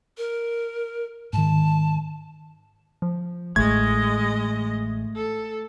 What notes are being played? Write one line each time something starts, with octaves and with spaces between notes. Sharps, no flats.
A#4
G#2 D#3 A5
F3
A1 G#3 A3 D#5 G#6
A4